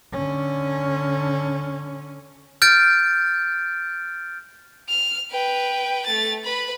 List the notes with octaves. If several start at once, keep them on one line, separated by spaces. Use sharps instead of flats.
D3 C#4
F6 G6 A6 D7
F6
B4 G5
A3 A6
B4 B5